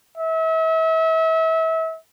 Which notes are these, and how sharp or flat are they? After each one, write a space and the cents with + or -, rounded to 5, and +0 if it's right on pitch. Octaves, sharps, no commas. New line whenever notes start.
E5 -35